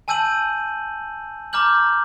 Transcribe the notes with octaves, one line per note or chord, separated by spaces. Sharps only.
G#5 A5 E6 G6 D#7 F#7
A#5 D6 F6 G6 F#7